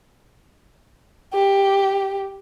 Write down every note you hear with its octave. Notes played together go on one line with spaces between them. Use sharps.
G4